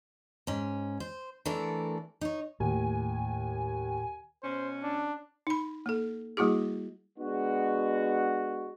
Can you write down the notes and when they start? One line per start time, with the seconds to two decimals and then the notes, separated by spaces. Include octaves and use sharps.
0.47 G#2 C#4
1.00 C5
1.46 E3 A3 D4 A4 A#4
2.21 D#4 C#5
2.60 D#2 A2 G#5
4.43 B2 C#4 C5
4.83 D4
5.47 D#4 B5
5.86 A#3 A4
6.37 G3 A#3 E4 F#4 G#4
7.19 G#3 B3 D4 F#4